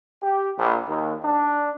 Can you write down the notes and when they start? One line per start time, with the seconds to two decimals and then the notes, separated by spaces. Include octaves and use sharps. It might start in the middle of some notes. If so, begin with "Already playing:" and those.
0.22 G4
0.58 A#1
0.89 D#2
1.24 D4